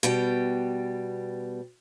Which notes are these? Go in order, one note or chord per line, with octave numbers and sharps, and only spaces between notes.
B2 G3 G5